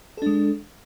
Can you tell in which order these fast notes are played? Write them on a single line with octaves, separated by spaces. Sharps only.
A4 D4 G#3